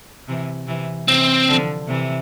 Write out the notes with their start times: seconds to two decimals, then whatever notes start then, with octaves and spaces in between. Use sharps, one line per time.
0.28 C3 E3
0.67 C3 E3
1.08 C3 E3 C4
1.48 D3 F3
1.88 C3 E3